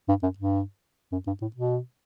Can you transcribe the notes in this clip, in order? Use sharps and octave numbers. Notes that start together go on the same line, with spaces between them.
G2
F#2
G2
F#2
G2
A2
B2